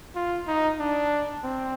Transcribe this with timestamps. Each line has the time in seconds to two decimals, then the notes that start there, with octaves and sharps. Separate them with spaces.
0.15 F4
0.47 D#4
0.80 D4
1.44 C4